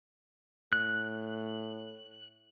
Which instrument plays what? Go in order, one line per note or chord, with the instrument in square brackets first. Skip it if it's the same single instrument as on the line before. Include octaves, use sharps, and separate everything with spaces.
[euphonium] A2 [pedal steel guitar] F#6